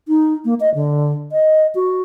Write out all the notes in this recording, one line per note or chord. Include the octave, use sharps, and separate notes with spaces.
D#4
A#3
D#5
D3
D#5
F#4